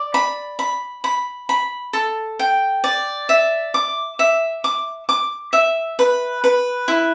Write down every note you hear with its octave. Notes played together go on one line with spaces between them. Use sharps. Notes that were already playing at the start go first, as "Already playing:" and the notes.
Already playing: D5
B5
B5
B5
B5
A4
G5
D5
E5
D6
E5
D6
D6
E5
B4
B4
E4